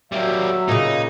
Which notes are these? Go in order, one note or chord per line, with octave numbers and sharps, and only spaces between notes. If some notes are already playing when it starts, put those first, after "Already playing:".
F#3 G3 A#3 E5
A#2 C#3 D#4